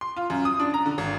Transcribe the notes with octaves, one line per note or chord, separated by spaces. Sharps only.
C6
F4
F#2
D#6
D4
A#5
D3
G#1